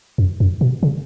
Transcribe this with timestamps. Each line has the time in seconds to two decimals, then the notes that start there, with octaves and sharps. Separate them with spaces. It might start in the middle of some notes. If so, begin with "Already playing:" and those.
0.18 F#2
0.40 F#2
0.61 B2
0.83 C#3